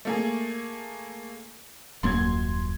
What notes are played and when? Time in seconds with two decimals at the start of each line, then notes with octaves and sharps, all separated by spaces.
0.05 A3 A#3 G#4
2.03 D#1 F#2 A#3 C6 G#6